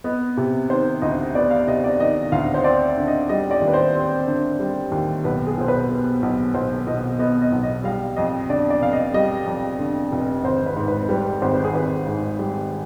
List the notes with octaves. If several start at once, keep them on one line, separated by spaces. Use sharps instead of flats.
B3 D#5
C3
D#3 C5
D2 D#5
B3 D5
F5
C3 D#5
D5
D#3 D#5
D2 F5
C5
C4 D5
D3
D#5
G3 D#5
D5
D#2
B4
C5
C4
D3
G3
D#2
B1 B4
G#4
B2 C5
B4
B3
B1
B1 C5
B2 D#5
B3 D#5
D#5
B1
D#5
G3 F5
F2 D#5
D3 D5
D5
F1 F5
D#5
G3 D#5
F2
D3
F1
G#1 C5
B4
G#2
B4
G3 B4
G#1 C5
B4
G#4
G#1 B4
G#2
G3